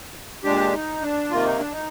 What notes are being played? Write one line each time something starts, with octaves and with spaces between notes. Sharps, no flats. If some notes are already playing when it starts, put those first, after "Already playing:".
A#2 G#3 D4 G4
D#4
D4
C3 D#3 A#3 F4
D#4
D4
D#4